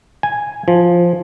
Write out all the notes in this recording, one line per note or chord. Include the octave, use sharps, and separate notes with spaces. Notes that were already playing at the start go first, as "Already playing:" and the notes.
G#5
F3